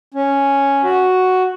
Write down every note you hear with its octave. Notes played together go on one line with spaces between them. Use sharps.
C#4
F#4